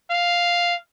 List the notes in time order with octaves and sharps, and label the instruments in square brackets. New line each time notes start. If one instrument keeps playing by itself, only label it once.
[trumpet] F5